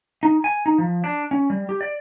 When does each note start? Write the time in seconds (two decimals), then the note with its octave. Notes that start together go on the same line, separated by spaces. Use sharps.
0.23 D#4
0.44 G#5
0.66 D#4
0.78 F3
1.04 D4
1.31 C#4
1.50 G3
1.69 G4
1.81 D5